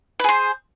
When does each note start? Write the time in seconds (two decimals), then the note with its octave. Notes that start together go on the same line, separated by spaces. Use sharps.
0.19 B4
0.24 G#4
0.29 C5